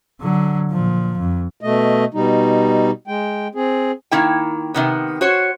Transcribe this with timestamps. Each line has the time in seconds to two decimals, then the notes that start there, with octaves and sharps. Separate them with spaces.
0.20 D3 F#3
0.70 A#2 F3
1.18 F2
1.61 B2 A3 D#5
2.14 B2 G3 D#4
3.07 G#3 G5
3.55 C4 G#4
4.11 D#3 A#3 E4 G5
4.74 C3 D#3 B3
5.21 F#4 C5 C#5